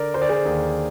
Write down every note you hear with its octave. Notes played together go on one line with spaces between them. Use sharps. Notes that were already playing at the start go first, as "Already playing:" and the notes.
Already playing: D3 A#4 D5
D3 C5
D5
G#4 C5
D#2